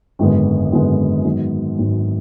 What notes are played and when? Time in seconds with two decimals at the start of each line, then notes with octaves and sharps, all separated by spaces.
0.19 G#1 F#2 D3 G#3 B3
0.72 G#1 F#2 D3 G#3 B3
1.25 G#1 G#2 F#3 B3
1.78 G#1 G#2 F#3 B3